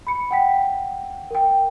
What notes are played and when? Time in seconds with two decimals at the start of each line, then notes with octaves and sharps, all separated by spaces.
0.07 B5 C#7
0.31 F#5 G5 B6
1.31 A#4 G5